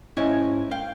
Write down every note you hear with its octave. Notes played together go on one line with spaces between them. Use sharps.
G#2 C#4 E4 D#5 G#5
F5 G5